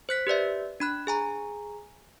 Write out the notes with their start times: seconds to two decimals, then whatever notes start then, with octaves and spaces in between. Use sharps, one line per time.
0.09 C5 F#6 B6
0.27 G4 B4 D5 E5
0.80 D4 B5 F#6
1.07 G#4 G#5 A#5